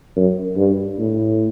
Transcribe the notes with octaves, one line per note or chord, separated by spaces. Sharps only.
F#2
G2
A2